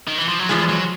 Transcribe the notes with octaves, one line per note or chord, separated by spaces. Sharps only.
D#3
E3
F3
F#3
E2 C#3 F3 G3 G#3
F#3